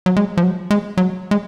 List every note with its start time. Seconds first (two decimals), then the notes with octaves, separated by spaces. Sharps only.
0.06 F#3
0.17 G#3
0.37 F3
0.43 F#3
0.71 G#3
0.97 F#3
1.31 G#3